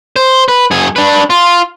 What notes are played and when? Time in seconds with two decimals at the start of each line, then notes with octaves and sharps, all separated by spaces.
0.16 C5
0.48 B4
0.71 F#2 G#4
0.96 D4 B4
1.30 F4